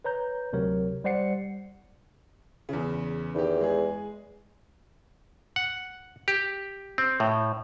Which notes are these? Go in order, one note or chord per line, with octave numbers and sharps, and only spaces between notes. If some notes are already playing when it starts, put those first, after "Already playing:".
B4 C#5 A#5 G6
D2 C3 F#3 A#4 C#5
G3 C5 D5 F#5 C7 C#7
E2 C#3
E2 D#3 G4
G#3 G#4
F#5
G4
C4
A2